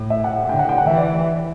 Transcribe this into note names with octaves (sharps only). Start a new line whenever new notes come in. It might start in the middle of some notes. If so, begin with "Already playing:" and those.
Already playing: A2
E5
F#5
D3 G5
F#5
G5
F#5
E3 E5
D5